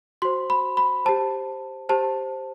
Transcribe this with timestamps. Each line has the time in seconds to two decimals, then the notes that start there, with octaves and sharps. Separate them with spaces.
0.22 F#4 C5 C6
0.50 B5
0.77 B5
1.05 G4 C5 A5
1.89 G4 C5 A5